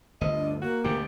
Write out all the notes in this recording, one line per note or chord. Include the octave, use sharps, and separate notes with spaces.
G1 D2 D#5
D4
A#3 F#4
D2 G#2 B2 G4